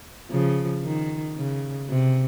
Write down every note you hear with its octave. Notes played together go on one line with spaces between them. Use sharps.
C#3 F3
D#3
C#3
C3